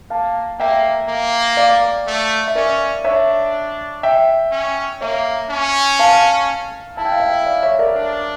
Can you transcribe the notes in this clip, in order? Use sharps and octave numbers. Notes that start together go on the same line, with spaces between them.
A#3 F5 A5
A#3 E5 G5
A#3
D5 F5
A3
E5
C#4 A#4 D5
D4 C#5 E5
E5 G5
C#4
A#3 C#5 E5
C#4
F5 A5
E4 A5
G5
F5
E5 G5
D5 F5
C#5 E5
A#4 D5
D4